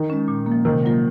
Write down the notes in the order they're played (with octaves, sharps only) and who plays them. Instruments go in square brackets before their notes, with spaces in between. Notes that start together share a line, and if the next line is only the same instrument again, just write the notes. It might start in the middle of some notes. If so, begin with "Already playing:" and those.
Already playing: [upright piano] D#3 D#4
[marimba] G#3 C#4
A#2
A#3
F3
[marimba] C3 [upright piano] D#3 D#4
[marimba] F#3 A#3 F4 A#4